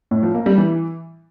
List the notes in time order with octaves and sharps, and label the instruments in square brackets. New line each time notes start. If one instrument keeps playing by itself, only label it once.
[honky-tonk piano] A2
F3
A#3
G3
E3